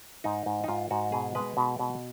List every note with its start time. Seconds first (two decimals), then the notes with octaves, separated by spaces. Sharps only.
0.24 G#2 D#4
0.46 G#2
0.64 D#4
0.68 G#2 F4
0.91 G#2 F#4
1.12 B2 G#4
1.35 G#3 B4
1.57 B2
1.79 B2